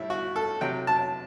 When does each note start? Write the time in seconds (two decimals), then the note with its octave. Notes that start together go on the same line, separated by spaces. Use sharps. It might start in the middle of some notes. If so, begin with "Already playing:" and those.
Already playing: A2 G3 E4
0.10 F#4
0.36 A4
0.61 C3 F#3 G5
0.87 A5